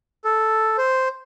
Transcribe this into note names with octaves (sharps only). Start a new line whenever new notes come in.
A4
C5